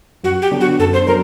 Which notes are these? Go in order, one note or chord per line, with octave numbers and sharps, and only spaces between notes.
F#2 F#4
G4
D3 F#3 B3 D4
F#4
F#2 A4
C5
D3 F#3 A#4